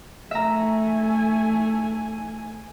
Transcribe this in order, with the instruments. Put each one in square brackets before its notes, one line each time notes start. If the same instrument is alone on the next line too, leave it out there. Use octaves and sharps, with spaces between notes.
[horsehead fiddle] A3 G#5 [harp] E5 A#5